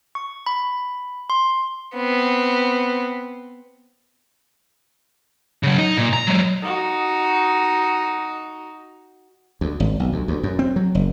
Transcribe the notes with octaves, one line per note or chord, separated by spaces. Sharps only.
C#6
B5
C6
B3 C4
C#3 F#3
D#4
A#2
A#5
F#3 G#3
D#4 F#4
D2
G#1
B1
D2
D2
F#2
C4
F#3
F#1